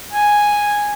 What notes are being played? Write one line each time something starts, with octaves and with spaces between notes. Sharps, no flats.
G#5